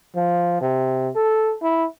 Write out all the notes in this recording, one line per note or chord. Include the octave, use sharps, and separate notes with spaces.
F3
C3
A4
E4